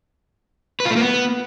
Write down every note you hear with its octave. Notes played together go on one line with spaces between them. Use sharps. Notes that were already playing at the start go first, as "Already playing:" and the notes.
B4
F4
A3
A#3
B3